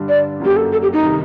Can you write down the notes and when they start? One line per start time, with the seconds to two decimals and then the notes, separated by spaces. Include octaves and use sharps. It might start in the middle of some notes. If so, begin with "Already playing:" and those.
Already playing: G2 D3 G3 D4
0.09 D5
0.40 F#2 F#3 A#3 G4
0.56 A4
0.72 A4
0.82 G4
0.93 D#4
1.03 C3 D#3 G3